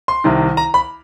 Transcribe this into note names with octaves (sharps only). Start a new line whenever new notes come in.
C6
C2 C3 D#3
A#5
B5